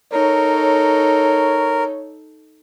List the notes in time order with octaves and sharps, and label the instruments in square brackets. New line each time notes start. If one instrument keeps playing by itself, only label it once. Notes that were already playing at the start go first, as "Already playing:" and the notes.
[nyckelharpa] D#4 A4 [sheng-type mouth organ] A#4 [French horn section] C#5